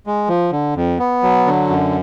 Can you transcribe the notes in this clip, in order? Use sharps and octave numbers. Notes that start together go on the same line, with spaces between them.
G#3
F3
D3
F2
B3
F#3
D3
F#2